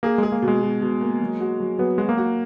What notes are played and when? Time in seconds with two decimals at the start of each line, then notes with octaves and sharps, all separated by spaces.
0.03 A#3 G#4
0.18 G#3 G#4
0.32 A#3
0.42 B2
0.48 G#3
0.62 B2
0.81 B2
1.01 A#3
1.20 F#3
1.40 F#4
1.60 F#3
1.78 F#3 B3
1.98 G#3 F#4
2.09 A#3
2.18 F#4